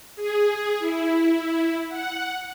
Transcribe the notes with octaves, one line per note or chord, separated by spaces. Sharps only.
G#4
E4
F#5